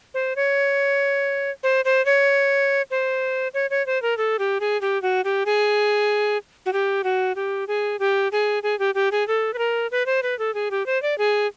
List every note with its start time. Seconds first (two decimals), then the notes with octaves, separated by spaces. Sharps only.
0.14 C5
0.36 C#5
1.63 C5
1.85 C5
2.06 C#5
2.91 C5
3.54 C#5
3.70 C#5
3.86 C5
4.02 A#4
4.18 A4
4.39 G4
4.60 G#4
4.81 G4
5.02 F#4
5.24 G4
5.46 G#4
6.66 F#4
6.73 G4
7.04 F#4
7.36 G4
7.68 G#4
8.00 G4
8.32 G#4
8.63 G#4
8.79 G4
8.95 G4
9.12 G#4
9.28 A4
9.54 B4
9.58 A#4
9.91 B4
10.06 C5
10.23 B4
10.39 A4
10.54 G#4
10.71 G4
10.86 C5
11.02 D5
11.18 G#4